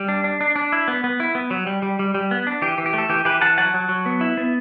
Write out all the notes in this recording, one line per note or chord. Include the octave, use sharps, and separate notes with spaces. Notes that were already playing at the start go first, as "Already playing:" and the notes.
Already playing: G3
D4
D4
D4
D4
E4
B3
B3
E4
B3
F#3
G3
G3
G3
G3
B3
D4
E3 G4
E3
G4
A3 A4
E3 G4
E3 G4 B4
E3 F#5 A5
F#3 F#5 A5
F#3
F#3
B3
E4
B3